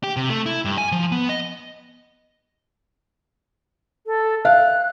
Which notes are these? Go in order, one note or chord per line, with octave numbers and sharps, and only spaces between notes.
G4
C3
A3
E4
G2
G#5
F3
B3
D#5
A4
E5 F5 F#6